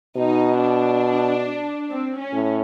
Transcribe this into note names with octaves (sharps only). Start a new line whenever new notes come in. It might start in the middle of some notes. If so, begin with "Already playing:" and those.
B2 D#4
D4
C4
C#4
A2